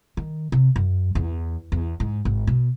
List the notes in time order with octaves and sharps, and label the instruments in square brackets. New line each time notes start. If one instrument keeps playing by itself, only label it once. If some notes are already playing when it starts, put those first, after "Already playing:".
[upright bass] D#3
C3
F#2
E2
E2
G#2
G#1
B2